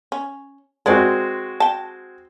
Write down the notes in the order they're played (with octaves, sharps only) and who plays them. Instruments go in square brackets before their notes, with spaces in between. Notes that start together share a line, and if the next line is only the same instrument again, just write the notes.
[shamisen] C#4
[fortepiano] G#3 C4 F#4 [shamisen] A#4 D5
[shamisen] G5 A5